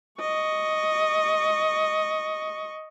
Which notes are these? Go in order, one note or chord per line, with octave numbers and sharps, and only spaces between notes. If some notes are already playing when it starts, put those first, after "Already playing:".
D#5 C#6